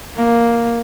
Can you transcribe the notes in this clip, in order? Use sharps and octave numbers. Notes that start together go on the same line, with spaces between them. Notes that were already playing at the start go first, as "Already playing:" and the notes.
A#3